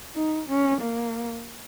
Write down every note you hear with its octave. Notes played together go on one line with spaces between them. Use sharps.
D#4
C#4
A#3